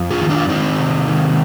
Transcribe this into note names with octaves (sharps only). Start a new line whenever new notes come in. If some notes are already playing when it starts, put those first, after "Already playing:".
Already playing: F2
F4 G#4
D#3
D4 F4
D#3 C4 D#4
C3
D#3